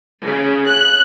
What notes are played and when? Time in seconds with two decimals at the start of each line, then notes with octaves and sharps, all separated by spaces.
0.25 C#3
0.67 F#6